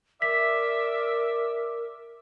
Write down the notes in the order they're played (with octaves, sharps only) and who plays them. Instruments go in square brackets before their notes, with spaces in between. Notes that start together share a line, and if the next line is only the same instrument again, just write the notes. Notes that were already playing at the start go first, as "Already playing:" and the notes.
[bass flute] A#4 [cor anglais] D5 [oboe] E5 [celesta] B6